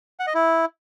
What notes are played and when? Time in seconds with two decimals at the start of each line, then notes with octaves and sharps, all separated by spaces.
0.20 F#5
0.27 D#5
0.35 E4